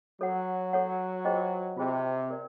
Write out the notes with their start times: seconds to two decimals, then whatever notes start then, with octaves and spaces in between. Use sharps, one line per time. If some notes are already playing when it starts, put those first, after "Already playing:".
0.21 F#3 A4 C#5 F#5
0.73 A4 C#5 F#5
1.25 F4 G#4 C5 D#5 G5
1.77 C3 F4 G#4 C5 D#5 G5
2.30 A#4 D5